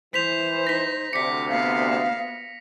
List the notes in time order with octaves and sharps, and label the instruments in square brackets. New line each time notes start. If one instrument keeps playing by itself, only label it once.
[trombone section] E3 [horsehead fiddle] C5 [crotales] B6 F7
[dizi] D#4 [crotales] A#6 B6
[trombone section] D2 C3 [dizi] D6 [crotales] B6 C#7
[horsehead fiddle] B3 [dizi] F5